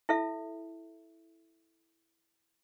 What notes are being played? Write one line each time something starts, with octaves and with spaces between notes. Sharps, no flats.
E4 A4 E5